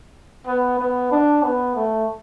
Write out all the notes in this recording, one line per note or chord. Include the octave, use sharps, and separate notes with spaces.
B3
B3
D4
B3
A3